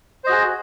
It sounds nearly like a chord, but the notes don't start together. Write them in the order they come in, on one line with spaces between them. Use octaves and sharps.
C5 D#5 F#4 G#4